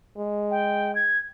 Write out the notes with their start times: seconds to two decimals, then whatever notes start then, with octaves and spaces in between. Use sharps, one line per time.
0.17 G#3
0.51 G5
0.95 G#6